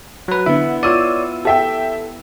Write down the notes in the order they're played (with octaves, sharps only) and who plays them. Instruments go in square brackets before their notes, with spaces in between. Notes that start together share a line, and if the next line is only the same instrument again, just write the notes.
[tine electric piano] F#3 B4
[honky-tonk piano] D3 [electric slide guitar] B3 E4 [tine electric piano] E5
[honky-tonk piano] F4 E6 D#7 [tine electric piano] C#5 D5
[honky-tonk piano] G4 E5 G5 [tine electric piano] A4